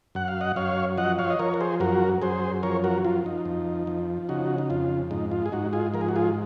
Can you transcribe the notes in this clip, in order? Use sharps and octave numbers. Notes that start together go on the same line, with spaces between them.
F#2 F#5
F5
D#5 F#5
F#2 C#5 F5
F3 D#5 F#5
C#5 F5
D#5
F3 A#4 C#5
A#4
G#4 C5
F#2 F#4 A#4
F#2 G#4 C5
F3 A#4 C#5
F#4 A#4
F3 F4
D#4
F2
F3
C#3 D#4 F#4
D#4
F2 F4
G#2 D#4
F4
G#4
G#2 D#4 F#4
F4 G#4
F3 A#4
G#4
F#4
F4 G#4